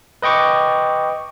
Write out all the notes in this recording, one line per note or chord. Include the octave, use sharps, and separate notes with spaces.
B4 D#5 G5 C#6 D6